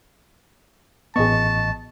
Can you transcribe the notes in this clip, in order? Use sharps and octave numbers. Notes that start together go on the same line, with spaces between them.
A1 B3 G#4 D#5 A5 C#6